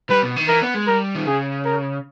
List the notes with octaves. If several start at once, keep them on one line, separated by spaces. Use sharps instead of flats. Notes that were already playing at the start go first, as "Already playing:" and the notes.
G3 B4
B2
D#3
E3 A#4
B3
G#3
G3 A#4
D#3
C#3 G#4
A#4